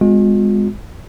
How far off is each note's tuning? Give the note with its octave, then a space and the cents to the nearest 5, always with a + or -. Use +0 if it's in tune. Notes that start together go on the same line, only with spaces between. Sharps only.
G#3 -10 B3 +45 F4 +45